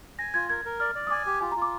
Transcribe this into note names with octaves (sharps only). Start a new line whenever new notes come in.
G#5 A#6
F4 G#6
A#4 G#6
A#4
D5 F6
D5
D#6
G#5 D6
G4
F4 G#5
A#5
F4
D6